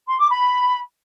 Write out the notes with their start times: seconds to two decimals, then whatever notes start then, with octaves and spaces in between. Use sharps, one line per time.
0.06 C6
0.18 D6
0.30 B5